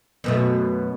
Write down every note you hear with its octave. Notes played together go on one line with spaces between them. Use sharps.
F#2 B2 A3